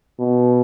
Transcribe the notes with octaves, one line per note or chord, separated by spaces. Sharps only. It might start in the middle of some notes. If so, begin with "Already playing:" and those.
B2